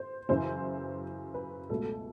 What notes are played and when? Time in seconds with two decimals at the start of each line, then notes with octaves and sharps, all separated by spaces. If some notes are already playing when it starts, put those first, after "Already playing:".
Already playing: C5
0.29 F#2 C#3 E3 C5
1.34 B4
1.70 C#2 B2 F#3 A3 A4